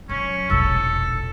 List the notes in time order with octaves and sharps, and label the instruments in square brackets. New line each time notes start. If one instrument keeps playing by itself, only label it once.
[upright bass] F#3 [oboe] C#4
[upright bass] E1 A#1 [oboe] A4